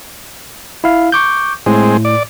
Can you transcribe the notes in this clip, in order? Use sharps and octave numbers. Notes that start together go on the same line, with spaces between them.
E4 F5
C#6 D6 G6
A2 G#3 C4
D5